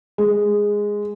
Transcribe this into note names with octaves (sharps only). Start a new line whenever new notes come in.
G#3